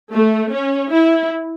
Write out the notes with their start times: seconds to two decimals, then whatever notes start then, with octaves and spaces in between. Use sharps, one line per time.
0.13 A3
0.53 C#4
0.92 E4